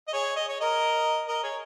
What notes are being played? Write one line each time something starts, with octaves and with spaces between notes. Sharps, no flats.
D#5
G#4 C#5
D#5
C#5
A#4 D#5
A#4 D#5
G#4 C#5